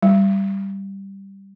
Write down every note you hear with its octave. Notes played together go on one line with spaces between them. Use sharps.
G3